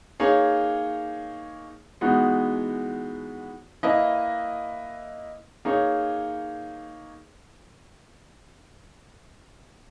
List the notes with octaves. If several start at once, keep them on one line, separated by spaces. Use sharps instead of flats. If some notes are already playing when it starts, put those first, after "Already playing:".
A#3 D#4 G#4 C#5
E3 G#3 B3 D#4 F#4
A#3 E4 B4 D#5
A#3 D#4 G#4 C#5